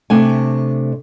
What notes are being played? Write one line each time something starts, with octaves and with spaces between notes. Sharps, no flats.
C3 A3 D4 G#5